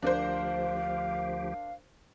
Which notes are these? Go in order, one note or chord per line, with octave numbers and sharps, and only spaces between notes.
D2 F3 D4 G4 A#4 C5 F5